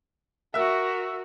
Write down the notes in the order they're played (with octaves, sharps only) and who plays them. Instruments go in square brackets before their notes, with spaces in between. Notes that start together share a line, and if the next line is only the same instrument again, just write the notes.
[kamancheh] F#4 A#4 [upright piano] E5 E6